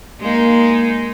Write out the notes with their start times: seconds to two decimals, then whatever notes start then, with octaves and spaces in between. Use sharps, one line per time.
0.21 G#3 A#3 D#4